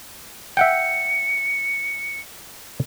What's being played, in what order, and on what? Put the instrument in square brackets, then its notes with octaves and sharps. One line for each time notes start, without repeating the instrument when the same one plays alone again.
[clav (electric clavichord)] E5 F#5 G5 [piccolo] C#7